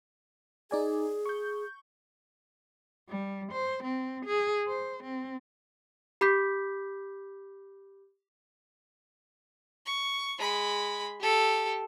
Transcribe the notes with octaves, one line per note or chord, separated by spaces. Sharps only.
D#4 G#4 D5 G#5
C#6 G6
G3
C5
C4
G#4
C5
C4
G4 B5 D6 G6 B6
C#6
G#3 B5
G4 A4